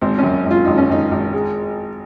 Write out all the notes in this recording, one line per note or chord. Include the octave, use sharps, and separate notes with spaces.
G#1 C4
F#2 C#4
G#1
F4
G#1 D#4
C#4
G#1 D#4
G#1
G#3